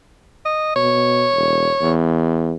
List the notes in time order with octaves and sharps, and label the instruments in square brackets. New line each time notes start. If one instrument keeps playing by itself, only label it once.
[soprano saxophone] D#5
[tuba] B2 [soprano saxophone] C#5
[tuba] E1
E2